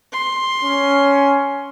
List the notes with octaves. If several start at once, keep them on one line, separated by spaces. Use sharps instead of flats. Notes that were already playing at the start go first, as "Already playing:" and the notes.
C6
C#4